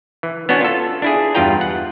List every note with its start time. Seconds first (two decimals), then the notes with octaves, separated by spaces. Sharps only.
0.23 E3
0.49 B3 C#4 D4 F#4
0.61 F4 A4
1.02 D4 E4 G#4
1.34 E2 G2 F4 B4 G5 A#5
1.61 F#5